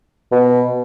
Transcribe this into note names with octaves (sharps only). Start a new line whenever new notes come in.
B2